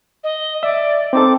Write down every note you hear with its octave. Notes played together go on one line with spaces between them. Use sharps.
D#5
D5 E5
C4 D#4 A4 D6